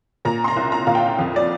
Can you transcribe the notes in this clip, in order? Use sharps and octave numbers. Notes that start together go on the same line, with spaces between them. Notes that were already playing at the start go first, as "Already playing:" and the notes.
A#2 A#5
C6
A#5
C2
A#5
A#2 F5
G5
F2
D5